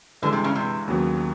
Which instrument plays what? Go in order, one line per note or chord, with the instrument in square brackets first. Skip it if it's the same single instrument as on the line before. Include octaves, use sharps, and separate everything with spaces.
[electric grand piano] G2 E3 G#3 [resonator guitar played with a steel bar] D3
[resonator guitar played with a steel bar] C3
C#3
C3
[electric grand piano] D#2 C#3 F#3 B3